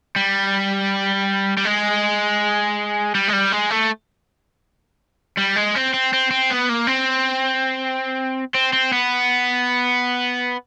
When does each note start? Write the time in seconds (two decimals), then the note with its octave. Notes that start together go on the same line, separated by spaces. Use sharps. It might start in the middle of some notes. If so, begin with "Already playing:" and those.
0.16 G3
1.57 G3
1.65 G#3
3.15 G3
3.28 G#3
3.33 G3
3.52 G#3
3.70 A3
5.38 G3
5.57 G#3
5.76 C4
5.94 C4
6.13 C4
6.31 C4
6.50 B3
6.69 A#3
6.87 C4
8.55 C4
8.73 C4
8.93 B3